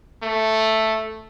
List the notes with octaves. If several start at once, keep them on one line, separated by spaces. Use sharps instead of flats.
A3